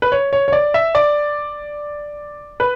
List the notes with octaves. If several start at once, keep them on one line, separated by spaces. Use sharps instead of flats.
B4
C#5
C#5
C#5
D5
E5
D5
B4